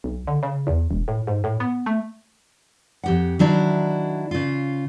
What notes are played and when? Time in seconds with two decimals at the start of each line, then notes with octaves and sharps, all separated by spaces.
0.04 B1
0.27 D3
0.43 C#3
0.67 E2
0.91 E1
1.08 A2
1.27 G#2
1.44 A2
1.60 B3
1.86 A3
3.04 F2 G4 F#5
3.39 D#3 F#3 D4 E4
4.31 C#3 F4